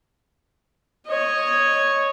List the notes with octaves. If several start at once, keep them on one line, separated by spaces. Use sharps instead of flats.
C#5 D#5